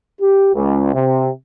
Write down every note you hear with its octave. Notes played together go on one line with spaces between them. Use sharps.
G4
C#2
C3